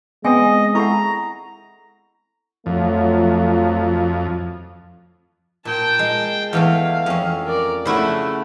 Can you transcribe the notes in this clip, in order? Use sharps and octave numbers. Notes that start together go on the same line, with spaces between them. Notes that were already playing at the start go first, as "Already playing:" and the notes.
G#3 B3 C4 D#5 G5 G#5
E4 A4 F#5 A#5 C#6
F2 F3 F#3 A3
A#2 G5 A5
G#3
E2 E3 A3 F5
F2 C#4
A#4 D5
C#3 A3 E4 F#4